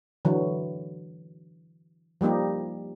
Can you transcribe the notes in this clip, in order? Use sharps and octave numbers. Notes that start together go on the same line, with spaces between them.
D3 E3 F#3
F3 G3 A#3 D#4 G4